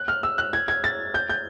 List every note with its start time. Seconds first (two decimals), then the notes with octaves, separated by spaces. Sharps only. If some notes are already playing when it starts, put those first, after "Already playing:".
Already playing: F#6
0.08 F6
0.23 E6
0.38 F#6
0.53 G#6
0.68 G#6
0.84 A6
1.14 G6
1.29 G6